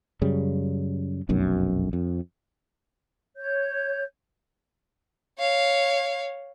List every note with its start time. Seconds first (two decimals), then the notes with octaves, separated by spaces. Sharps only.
0.22 F#2 C#3 G3
1.29 F1 B1 F#2
1.93 F2
3.37 C#5 G6
5.39 C#5 F5